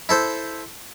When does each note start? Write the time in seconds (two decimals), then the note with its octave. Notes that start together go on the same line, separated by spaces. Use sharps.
0.09 E4 A4 C5